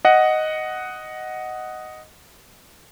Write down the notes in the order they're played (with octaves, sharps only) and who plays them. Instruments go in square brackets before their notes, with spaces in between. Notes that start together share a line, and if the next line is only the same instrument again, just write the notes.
[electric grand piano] D#5 F#5